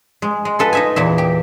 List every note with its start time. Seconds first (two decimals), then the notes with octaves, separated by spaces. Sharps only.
0.22 G#3
0.45 G#3
0.59 F4 A4 B4
0.73 D#4 E5 G#5
0.96 E2 A#2 E5
1.18 G4